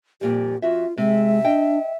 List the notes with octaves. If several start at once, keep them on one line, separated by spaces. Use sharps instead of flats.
F2 A#2 G3 G4
F2 F4 F#4 E5
C3 G#3 E5
D4 D#5 G5